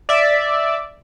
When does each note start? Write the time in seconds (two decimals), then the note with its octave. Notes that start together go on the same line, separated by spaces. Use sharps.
0.09 D5 E5